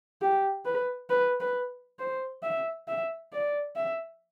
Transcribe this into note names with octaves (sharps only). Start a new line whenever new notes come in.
G4
B4
B4
B4
C5
E5
E5
D5
E5